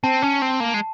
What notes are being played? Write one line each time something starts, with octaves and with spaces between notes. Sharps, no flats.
C4 A5
C#4
C4
A#3
G#3